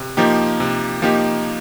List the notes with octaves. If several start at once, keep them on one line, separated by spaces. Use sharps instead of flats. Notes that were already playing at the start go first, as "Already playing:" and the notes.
Already playing: C3
F3 A#3 D#4 G4
C3
F3 A#3 D#4 G4